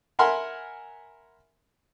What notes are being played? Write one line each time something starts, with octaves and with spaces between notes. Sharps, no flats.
A#4 E5 F#5 G#5 B5 C6